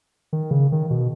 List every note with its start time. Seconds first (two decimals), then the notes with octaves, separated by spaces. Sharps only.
0.33 D#3
0.51 C#3
0.72 D#3
0.90 B2